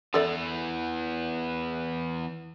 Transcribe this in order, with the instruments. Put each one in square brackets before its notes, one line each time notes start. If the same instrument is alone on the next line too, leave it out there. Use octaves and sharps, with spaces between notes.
[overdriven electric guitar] E3 B3 [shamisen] A4 D5 E5